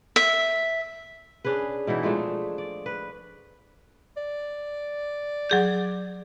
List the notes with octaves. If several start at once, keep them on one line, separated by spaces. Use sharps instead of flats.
E5
C#4 D4 G#4 B4
B2 E3 D#4 E4
F3 G#3 A3 D4
D5
B4
D5
F#3 G#4 G6